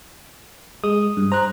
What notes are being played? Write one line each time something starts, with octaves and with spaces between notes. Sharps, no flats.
G#3 D#6
G2
C5 A#5 F#6